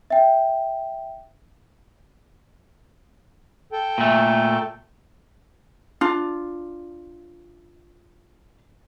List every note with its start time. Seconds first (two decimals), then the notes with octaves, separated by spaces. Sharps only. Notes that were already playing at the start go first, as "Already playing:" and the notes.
0.10 E5 G5
3.72 A4 G5
3.98 A#2 A3
6.01 D4 F4